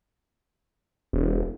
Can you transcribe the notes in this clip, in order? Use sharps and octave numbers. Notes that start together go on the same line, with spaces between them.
E1